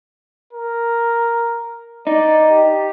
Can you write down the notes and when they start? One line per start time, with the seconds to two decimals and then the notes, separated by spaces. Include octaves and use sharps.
0.53 A#4
2.07 D#4 D5
2.51 G4